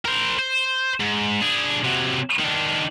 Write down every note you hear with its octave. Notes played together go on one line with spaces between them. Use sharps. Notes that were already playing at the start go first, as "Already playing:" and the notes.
A#4 C5
C5
G#2
D4 G#4
C3 F#3
D#3 D4